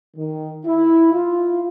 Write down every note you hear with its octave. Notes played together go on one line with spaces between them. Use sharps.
D#3
E4
F4